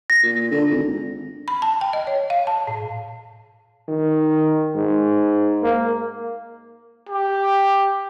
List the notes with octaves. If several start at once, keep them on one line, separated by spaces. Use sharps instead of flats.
A#6
A#2
D3
G#1
B5
A5
G5
D#5
C#5
F5
A5
A2
D#3
G#2
A#3
G4